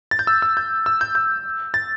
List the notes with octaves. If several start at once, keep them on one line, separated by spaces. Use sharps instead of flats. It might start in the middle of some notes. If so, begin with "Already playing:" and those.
A6
G6
E6
E6
G6
E6
G6
G6
A6